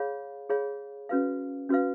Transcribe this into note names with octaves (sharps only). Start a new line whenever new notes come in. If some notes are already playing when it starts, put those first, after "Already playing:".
Already playing: G#4 C#5 F5 B5
G#4 C#5 F5 B5
C#4 F#4 B4 F5
C#4 F#4 B4 F5